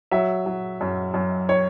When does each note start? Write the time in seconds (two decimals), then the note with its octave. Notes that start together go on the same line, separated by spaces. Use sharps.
0.11 F#3 E5
0.46 F#3
0.81 F#2
1.14 F#2
1.49 C#5